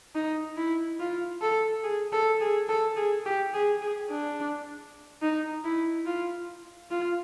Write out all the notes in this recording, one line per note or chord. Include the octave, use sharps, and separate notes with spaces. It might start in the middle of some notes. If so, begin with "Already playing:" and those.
D#4
E4
F4
A4
G#4
A4
G#4
A4
G#4
G4
G#4
G#4
D4
D#4
E4
F4
F4